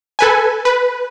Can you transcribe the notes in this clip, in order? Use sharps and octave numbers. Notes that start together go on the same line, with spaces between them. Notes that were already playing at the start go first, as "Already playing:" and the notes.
A4 B4 G#5
B4